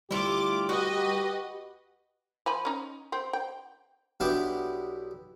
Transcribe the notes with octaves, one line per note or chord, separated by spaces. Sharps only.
D2 G3 E4 F4 G4 D6
F#4 B4 D#5
F3 G#5 B5
C#4 D#4
C4 C5
G5
B1 B3 D4 E4 G4 D5